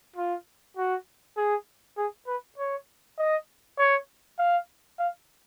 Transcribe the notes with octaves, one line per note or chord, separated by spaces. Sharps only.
F4
F#4
G#4
G#4
B4
C#5
D#5
C#5
F5
F5